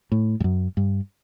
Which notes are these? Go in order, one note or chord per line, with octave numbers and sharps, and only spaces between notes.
A2
G2
F#2
G2